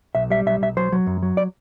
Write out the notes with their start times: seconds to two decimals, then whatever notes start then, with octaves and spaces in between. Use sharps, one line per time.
0.15 B1 E5
0.30 G3 E5
0.46 B1 E5
0.61 B1 E5
0.77 F#3 C5
0.92 F#3
1.07 F#2
1.23 F#3
1.37 D5